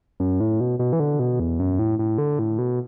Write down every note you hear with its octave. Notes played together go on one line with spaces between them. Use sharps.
F#2
A2
B2
B2
E3
D3
B2
E2
F#2
A2
A2
D3
A2
B2